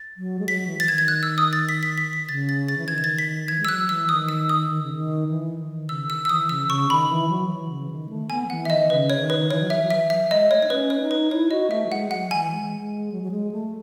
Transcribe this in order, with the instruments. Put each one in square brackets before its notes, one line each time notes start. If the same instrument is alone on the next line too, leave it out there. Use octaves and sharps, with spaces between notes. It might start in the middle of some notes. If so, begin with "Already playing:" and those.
Already playing: [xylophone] A6
[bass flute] F#3
G#3
[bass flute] F#3 [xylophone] B6
[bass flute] E3
[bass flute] E3 [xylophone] A6
[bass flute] D#3 [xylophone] G#6
[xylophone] G#6
F#6
E6
D#6
A6
B6
B6
B6
B6
[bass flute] C#3 [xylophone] A6
[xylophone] A6
A6
[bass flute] E3
[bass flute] D#3 [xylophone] G#6
[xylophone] G#6
A6
B6
[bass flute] E3 [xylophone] G#6
[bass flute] G#3
[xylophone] E6
[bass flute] F#3 [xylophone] F#6
[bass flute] E3 [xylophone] E6
[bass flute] D#3 [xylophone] D#6
[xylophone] E6
D#6
[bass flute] D#3
C#3
D#3
E3
D#3
[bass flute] C#3 [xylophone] E6
[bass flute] D#3 [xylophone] E6
[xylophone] E6
[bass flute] E3 [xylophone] D#6
[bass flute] C#3 [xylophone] E6
[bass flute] C#3 [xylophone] C#6
[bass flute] D#3 [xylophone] B5
[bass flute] E3
F#3
E3
C#3
D#3
A3
[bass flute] B3 [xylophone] G#5
[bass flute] F#3
[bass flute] E3 [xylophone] F#5
[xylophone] E5
[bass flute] D#3 [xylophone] D#5
[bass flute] C#3 [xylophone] B4
[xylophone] C#5
[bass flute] D#3
[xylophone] B4
[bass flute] E3 [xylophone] C#5
[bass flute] F#3
[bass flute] E3 [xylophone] E5
[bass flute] F#3
[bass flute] E3 [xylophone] E5
[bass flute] F#3 [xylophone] E5
[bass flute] G#3 [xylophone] D#5
[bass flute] A3 [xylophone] C#5
[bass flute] D#4 [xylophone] C#5
[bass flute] C#4 [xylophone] B4
[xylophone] C#5
[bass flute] D#4
[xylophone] B4
[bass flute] E4 [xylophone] C#5
[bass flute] F#4 [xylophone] D#5
[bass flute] A3 [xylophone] E5
[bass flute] F#3
[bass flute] G#3 [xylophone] F#5
[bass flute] F#3 [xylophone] F#5
[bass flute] E3 [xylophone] G#5
[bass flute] G#3
G#3
F#3
F#3
G#3
A3